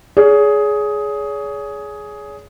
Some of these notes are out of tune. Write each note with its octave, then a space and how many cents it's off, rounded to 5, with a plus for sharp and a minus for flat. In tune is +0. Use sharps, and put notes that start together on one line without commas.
G#4 +10 C#5 +40